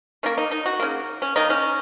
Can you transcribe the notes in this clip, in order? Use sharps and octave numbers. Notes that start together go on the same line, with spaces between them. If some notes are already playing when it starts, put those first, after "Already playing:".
D#3 A#3 C#4
D#4
D#4
F#4
C#3 A#3
C#4
D#3 A#3 D#4
C#4